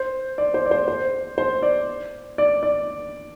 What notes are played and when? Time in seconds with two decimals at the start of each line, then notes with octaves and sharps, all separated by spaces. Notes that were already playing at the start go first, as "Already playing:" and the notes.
Already playing: C5
0.38 D5
0.54 C5
0.66 D5
0.71 C5
0.88 C5
1.38 C5
1.62 D5
2.38 D5
2.63 D5